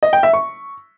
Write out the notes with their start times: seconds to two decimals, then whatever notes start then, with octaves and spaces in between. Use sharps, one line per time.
0.03 D#5
0.13 G5
0.23 E5
0.33 C#6